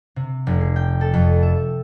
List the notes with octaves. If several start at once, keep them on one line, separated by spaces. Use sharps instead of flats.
C3
F1
G#4
G5
A4
F2
E5